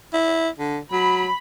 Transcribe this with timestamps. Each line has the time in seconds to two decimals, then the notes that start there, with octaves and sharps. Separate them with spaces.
0.13 E4
0.58 D3
0.92 F#3 B5